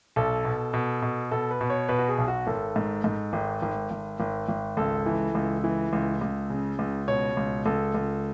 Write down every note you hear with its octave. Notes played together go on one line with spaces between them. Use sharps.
B1 A4
B2
B2
B2
B2 A4
B4
B2
C#5
B2 B4
F#4
G#4
B1
F#4
G#1 A4
G#2
G#2
G#1
G#1
G#1
G#1
G#1
C#2 A4
E3
C#2
E3
C#2
C#2
C#3
C#2
B2 C#5
C#2
C#2 A4
C#2